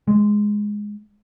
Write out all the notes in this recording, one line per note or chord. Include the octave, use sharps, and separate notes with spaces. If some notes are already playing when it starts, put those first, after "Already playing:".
G#3